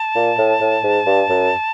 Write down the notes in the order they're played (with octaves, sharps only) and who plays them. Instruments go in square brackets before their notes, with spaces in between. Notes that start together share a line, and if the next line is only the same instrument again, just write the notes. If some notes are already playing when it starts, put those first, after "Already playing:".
Already playing: [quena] A5
[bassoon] A#2
A2
A2
G#2
G2
F#2